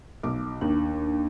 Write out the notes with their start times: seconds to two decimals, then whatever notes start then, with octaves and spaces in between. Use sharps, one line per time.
0.23 B1 D6
0.61 D#2 D4